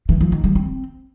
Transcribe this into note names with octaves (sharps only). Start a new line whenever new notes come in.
E3
F3
D#3
G3
C4